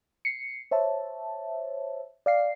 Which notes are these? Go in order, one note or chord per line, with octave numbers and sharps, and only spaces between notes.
C7 C#7
C5 C#5 E5 A5
D5 F5 C7